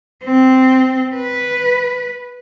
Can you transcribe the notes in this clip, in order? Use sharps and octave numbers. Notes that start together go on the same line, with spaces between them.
C4
B4